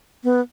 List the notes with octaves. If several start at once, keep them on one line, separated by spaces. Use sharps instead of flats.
B3